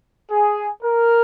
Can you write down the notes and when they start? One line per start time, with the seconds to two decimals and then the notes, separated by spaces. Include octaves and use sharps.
0.31 G#4
0.82 A#4